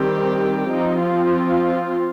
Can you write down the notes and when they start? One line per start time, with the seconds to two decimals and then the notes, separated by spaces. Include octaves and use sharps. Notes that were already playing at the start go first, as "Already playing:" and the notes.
Already playing: D#3 G3 C4 G4
0.70 F3 C4 D#4
1.02 F4